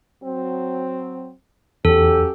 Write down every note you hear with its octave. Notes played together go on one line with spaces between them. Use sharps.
F#3 C4
E2 F#3 C#4 G4 A4